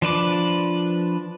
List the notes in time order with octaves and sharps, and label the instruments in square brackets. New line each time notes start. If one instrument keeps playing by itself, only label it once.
[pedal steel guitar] F3 D4 B4 D6